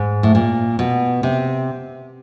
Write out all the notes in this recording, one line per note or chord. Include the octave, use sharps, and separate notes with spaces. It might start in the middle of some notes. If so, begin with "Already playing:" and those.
Already playing: G#2
A2
A#2
B2
C3